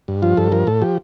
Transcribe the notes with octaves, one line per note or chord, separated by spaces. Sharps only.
G2
F3 F4
G2 A4
F3 A#4
A2 A4
F3 G4